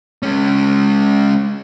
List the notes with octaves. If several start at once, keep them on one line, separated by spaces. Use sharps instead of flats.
G#3 C#4